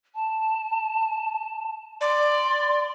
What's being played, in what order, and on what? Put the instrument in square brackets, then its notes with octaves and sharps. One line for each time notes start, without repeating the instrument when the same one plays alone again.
[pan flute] A5
[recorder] D5 [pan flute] C6